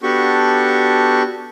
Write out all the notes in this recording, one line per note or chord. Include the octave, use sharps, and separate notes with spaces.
B3 D4 F#4 G4 A4 C#6